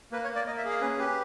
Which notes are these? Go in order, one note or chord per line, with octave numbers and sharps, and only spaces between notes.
A#3 B4
C#5
A#3
D5
A#3 D#5
E5
G#4
F5
C#4 B4
G4 B4